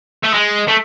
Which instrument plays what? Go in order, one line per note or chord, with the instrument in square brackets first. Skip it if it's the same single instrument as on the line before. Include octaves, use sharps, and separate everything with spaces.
[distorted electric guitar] A3
G#3
A3